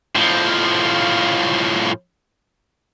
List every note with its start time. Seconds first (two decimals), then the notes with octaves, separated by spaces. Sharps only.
0.16 A2 F3